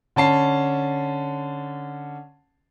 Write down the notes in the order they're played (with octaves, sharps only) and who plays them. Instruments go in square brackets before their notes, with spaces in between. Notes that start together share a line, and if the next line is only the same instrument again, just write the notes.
[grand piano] D3 C#4 A5 C7